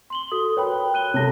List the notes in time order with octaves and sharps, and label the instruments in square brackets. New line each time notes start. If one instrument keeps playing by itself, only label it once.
[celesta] C6 F#7 G7
F#4 A4 D#6
[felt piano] A#4 B4 [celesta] C#5 G5 B5
[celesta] F#6 D#7 G7
[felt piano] C3 A3 [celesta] C#5 A5 A#6